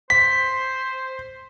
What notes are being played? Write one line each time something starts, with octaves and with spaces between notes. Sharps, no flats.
C5 B6